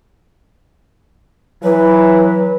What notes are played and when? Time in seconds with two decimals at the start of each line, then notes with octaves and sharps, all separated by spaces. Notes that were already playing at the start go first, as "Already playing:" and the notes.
1.64 E3 F#3 B4